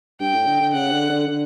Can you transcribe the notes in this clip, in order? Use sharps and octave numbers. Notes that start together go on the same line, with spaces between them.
G2 G5
A2
D3
D3
C#3 F#5
D3
D3
D3